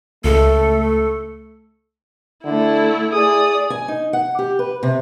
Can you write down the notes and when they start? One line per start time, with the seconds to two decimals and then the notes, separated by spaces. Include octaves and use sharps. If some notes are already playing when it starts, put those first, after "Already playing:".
0.24 C#2 A3 A4
2.45 D3 A3 E4
3.13 G#4 D5 D#6
3.70 G#5
3.88 D#4
4.13 F#5
4.39 G4
4.59 B4
4.83 C3